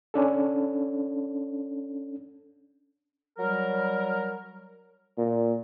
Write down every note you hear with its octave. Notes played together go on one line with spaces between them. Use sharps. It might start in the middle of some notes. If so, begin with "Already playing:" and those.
C#4 D4 A4
F#3 G3 A#4
A#2